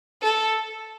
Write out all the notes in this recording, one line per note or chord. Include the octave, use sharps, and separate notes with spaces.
A4